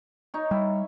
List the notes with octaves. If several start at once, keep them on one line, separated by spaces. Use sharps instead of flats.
D#4 C#5
G3 E4